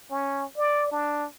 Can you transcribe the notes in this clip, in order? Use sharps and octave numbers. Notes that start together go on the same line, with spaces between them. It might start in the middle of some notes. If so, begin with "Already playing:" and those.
C#4
D5
D4